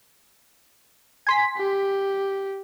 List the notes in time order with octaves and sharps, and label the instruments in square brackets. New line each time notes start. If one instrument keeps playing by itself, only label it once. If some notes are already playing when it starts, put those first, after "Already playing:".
[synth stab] G#5 C6 B6
[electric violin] G4